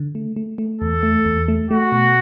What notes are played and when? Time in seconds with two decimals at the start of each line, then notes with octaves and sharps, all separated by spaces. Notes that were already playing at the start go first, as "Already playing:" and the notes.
Already playing: D3
0.15 A3
0.36 A3
0.58 A3
0.81 E2 A4
1.03 A3
1.25 E2
1.48 A3
1.70 A3 F#4
1.92 B2